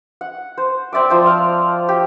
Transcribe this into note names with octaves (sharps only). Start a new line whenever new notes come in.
F#5
C5
C4 D5 E5 D6
F3 C5
F5 A5
G4